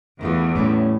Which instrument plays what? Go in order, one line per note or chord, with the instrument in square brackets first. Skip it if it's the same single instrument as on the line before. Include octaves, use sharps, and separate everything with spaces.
[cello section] E2 [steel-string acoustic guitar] D#3 A3 F4
[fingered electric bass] A2 [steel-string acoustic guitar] G3 A3 C#4